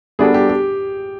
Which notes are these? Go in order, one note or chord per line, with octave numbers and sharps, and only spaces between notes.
G3 B3 D4 F#4 G#4 A4
G4
G4